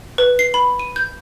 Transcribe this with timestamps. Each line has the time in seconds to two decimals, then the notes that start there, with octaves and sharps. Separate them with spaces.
0.18 B4
0.39 C7
0.54 B5
0.80 D#7
0.96 G6